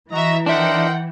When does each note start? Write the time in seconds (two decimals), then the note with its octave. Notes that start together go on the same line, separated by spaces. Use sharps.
0.11 E3 F#4 D#5 E5 A#5
0.46 D4 D#4 A#4 C5 E5 F#5 G5